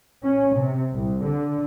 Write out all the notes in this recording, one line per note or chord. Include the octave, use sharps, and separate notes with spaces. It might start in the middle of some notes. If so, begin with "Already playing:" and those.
C#4
C3
C2
D3